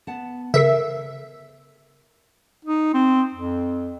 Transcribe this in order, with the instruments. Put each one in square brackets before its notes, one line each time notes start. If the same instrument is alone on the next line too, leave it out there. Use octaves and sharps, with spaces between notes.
[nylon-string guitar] B3 F#5 A5
[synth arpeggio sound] C#3 A4 B6 [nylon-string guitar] A#4 [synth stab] E5
[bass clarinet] D#4
C4
F2